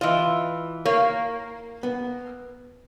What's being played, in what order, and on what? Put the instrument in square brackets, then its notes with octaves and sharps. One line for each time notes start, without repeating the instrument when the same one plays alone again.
[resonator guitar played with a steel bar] E3 F4 [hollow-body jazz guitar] D#5
[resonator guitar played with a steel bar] A#3 [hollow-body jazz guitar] C#5
[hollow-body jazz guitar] B3